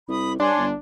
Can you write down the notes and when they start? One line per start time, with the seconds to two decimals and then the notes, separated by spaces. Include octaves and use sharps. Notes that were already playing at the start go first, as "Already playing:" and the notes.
0.09 C2 B5 D#6
0.40 G2 D4 C#5 G#5 C6
0.58 G1